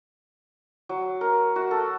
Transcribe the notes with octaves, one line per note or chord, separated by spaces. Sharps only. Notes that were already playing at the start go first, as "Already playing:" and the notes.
F#3
A#4
F#4
A4